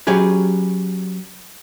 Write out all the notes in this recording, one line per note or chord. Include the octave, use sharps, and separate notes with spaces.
F#3 C#4 G4 G#4 B4